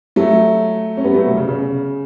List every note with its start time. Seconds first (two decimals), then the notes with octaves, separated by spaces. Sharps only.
0.16 F#3 A3
0.97 C#4
1.03 G3 B3
1.14 F#3 A3
1.25 B2
1.37 C#3
1.48 C#3